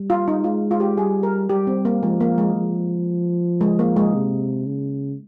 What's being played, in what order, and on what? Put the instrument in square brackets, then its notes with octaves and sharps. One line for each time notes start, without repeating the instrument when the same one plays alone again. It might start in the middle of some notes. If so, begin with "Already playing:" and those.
Already playing: [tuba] G3
[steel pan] F4
D#4
[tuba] G#3 [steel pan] F4
[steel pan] F4
G4
[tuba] G3 [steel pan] G#4
[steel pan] A#4
[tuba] G3 [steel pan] G4
[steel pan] C4
A#3
[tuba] F3 [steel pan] G#3
[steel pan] A#3
G#3
[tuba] F3
[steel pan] G#3
A#3
G#3
[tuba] C3
C#3